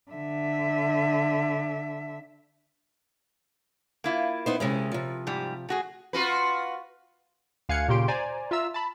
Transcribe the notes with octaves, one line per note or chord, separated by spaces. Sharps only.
D3 E5
A#3 E4 F4
B3 D#4 C5
C3 G#3 C#4
C3 F3
G#2 G3
A3 F#4 G#4
F4 F#4 B4
D2 F5 G#5 F#6 G#6 C#7
A#2 C#3 A#3 G4 C6 D7
C5 D5 G#5 A#5
F4 E5 A#5 E6
A5 B5